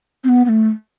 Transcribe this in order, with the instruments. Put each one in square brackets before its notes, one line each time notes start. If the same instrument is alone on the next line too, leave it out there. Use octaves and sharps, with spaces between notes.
[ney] C4
B3
B3
A3